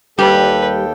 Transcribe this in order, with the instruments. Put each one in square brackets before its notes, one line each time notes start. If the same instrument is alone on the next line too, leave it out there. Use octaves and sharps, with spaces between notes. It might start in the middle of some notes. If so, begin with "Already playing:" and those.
[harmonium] D#2 A4 G5 [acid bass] G3 [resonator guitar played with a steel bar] G4 [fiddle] B4